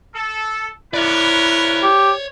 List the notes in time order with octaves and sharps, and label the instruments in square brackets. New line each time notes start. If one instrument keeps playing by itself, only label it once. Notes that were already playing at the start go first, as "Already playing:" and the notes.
[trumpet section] A4
[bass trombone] E4 [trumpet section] F#4 A#4 B4 [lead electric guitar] C#5 D5
[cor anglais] G4